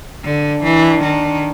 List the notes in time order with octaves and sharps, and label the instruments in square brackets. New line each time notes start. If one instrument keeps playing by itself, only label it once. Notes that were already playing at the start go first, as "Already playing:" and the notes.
[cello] D3 [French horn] D4
[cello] E3
D#3